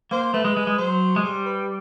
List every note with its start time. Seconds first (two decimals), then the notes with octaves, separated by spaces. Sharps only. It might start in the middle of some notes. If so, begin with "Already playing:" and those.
0.11 A#3 C5
0.34 A3 B4
0.44 G#3
0.57 G#3
0.67 G#3
0.78 F#3 C5
1.16 G#3
1.23 G3 C5
1.46 B4